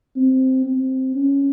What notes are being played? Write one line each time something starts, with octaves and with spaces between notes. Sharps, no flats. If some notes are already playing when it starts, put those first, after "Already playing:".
C4
C4
C#4